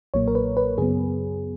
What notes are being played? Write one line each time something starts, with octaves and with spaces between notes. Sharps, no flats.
B1 A#2 F#3 A#3 C#5
A#4
B4
B4
F#2 C#3 F#3 B3 G#4